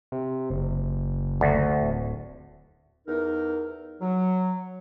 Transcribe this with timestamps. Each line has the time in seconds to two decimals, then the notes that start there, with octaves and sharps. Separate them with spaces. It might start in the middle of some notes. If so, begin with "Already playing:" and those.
0.12 C3
0.50 F#1
1.41 D2
1.82 D1
3.07 E2 D#4 A#4
4.01 F#3